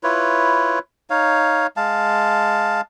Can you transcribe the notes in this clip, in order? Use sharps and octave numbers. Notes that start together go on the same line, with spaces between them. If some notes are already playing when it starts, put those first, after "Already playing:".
E4 F4 B4 C#5
D#4 C#5 F5
G#3 F5 A5